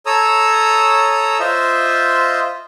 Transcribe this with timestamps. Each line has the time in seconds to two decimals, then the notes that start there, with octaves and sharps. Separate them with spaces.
0.06 A4 C#5 A#5 D#6 E6
1.40 F4 C5 D#5 E5